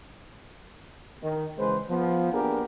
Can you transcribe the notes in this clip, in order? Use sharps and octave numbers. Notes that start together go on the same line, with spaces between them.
D#3
C#3 E3 G#3 B4 C5
F3 B3
A#3 B3 D4 G4 G#4 A#4